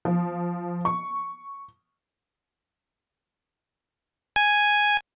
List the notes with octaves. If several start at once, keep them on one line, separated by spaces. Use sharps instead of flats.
F3
C#6
G#5